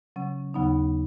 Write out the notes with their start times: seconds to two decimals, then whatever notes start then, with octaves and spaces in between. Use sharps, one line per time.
0.16 C#3 F#3 C#4
0.54 D#2 C#3 F#3 B3 D#4